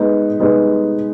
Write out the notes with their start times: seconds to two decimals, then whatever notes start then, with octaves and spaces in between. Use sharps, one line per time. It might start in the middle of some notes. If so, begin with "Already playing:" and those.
Already playing: G#3 B3 D#4
0.40 G#3 B3 D#4